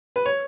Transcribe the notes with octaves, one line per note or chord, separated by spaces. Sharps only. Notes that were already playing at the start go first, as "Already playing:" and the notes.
B4
C#5